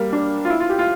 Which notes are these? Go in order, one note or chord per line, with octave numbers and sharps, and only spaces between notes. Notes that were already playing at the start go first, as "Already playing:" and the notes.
Already playing: G3 A#3
D4
F4
E4
F4
G4
F4